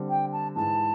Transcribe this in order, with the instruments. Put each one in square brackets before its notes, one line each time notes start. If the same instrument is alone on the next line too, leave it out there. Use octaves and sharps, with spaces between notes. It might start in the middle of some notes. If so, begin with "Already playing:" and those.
Already playing: [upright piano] D3 G3 C4
[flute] G5
A5
[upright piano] G#2 E3 G#3 [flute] A5